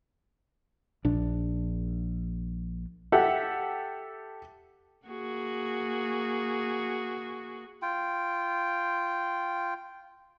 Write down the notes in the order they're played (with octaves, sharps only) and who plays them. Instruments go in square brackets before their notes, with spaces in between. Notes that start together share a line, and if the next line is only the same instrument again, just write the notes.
[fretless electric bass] A#1 D4
[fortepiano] G4 A4 E5 F#5
[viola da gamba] A#3 F#4 G#4
[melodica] F4 G5